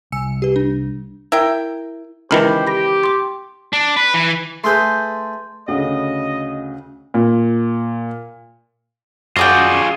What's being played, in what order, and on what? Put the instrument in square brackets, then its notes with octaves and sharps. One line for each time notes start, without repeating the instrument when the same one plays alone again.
[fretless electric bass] C2 [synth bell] G#5 E6 C#7
[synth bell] G4 B4
D4
[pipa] E4 A#4 G5
[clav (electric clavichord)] C#2 D#3 E3 [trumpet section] G4 C5 [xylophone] B5 F6 F#7
[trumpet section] G4 [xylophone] B5 A#6
[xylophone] C6 D6
[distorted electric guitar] D4
B4
E3
[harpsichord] A3 G#4 B4 [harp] C6 G6
[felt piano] D2 C#3 [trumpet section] D#5
[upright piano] A#2
[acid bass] F#2 [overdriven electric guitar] F4 G#4 [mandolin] F#4 D5 G5